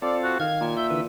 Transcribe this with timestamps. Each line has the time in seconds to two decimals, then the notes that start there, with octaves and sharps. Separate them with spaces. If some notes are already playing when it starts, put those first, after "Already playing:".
0.02 C4 F4 A4 D5
0.24 F#4
0.40 D#3 F5 G#6
0.61 A#2
0.77 E5 G6
0.90 D3 E3 B4